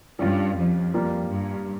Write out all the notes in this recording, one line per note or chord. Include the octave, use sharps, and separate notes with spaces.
G2 G3 C#4 F4
F2
G3 A#3 F4
G2